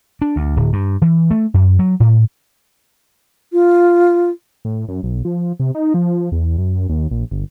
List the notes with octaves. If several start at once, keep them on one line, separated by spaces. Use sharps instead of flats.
D4
D2
D1
G2
E3
A3
F#2
F#3
A2
F4
A2
F#2
B1
F3
C3
D#4
F3
E2
F#2
D#2
A#1
G1